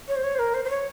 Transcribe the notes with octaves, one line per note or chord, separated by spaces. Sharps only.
C#5
C5
C#5
C5
A#4
C5
C5
C#5